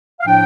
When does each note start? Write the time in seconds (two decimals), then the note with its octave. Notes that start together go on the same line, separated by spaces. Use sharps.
0.20 F5
0.25 A2 F3 D4 G5